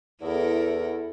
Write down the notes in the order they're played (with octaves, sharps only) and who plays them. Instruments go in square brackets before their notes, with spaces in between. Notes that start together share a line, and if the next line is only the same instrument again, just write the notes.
[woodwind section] E2 [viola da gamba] E4 A4 A#4